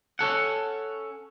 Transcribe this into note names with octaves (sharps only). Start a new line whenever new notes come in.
C#4 A4 F#5